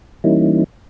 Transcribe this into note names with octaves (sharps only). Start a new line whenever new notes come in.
E3 G3 A#3 C#4 D#4 E4